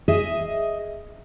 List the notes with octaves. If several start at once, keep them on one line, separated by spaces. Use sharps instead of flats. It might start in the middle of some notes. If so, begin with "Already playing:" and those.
G#4 D#5 E5